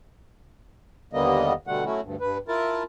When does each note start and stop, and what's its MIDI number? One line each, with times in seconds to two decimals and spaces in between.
1.13 1.53 39
1.13 1.53 50
1.13 1.53 55
1.13 1.53 58
1.13 1.53 59
1.13 1.53 75
1.67 1.84 47
1.67 1.84 50
1.67 1.84 55
1.67 1.84 57
1.67 1.84 78
1.85 2.01 54
1.85 2.01 57
1.85 2.01 61
1.85 2.01 64
1.85 2.01 66
2.04 2.16 38
2.04 2.16 43
2.21 2.38 43
2.21 2.38 71
2.48 2.83 64
2.48 2.83 65
2.48 2.83 70
2.48 2.83 81